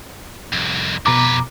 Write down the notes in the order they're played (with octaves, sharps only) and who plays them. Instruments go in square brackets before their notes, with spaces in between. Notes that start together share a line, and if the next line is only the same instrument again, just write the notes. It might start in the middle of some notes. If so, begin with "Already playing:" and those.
[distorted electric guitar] C2 F2
[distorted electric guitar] F2 B4 [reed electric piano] B2 A#5 D6